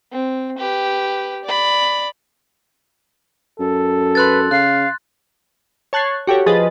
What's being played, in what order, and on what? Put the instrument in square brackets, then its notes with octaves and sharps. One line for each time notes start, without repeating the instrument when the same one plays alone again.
[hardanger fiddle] C4
G4 B4
D5 B5
[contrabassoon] F#2 [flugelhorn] A4
[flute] B4 [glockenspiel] C6 F#6 A6
[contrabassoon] C#3 [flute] F5 [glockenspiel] F#6
[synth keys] C#5 A5 F#6 G#6 C7
F#4 G4 A4 C#5
F3 G#4 B4 D#5 A6